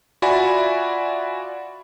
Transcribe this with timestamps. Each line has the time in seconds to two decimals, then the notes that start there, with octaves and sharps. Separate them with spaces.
0.22 F4 F#4 D5 E5 G#5 B5